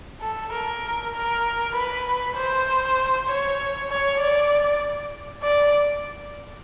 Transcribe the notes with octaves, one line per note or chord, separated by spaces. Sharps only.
A4
A#4
A#4
B4
C5
C#5
C#5
D5
D5